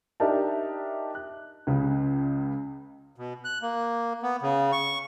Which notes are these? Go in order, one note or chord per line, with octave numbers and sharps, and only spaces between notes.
D4 D#4 G4 A#4 E5 A5
F#6
C#2 C#3
B2
F#6
A#3
B3
C#3
C#6